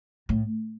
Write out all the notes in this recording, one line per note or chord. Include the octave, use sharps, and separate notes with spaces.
A2